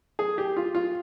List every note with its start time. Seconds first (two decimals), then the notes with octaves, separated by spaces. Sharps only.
0.19 G#4
0.38 G4
0.57 F4
0.75 F4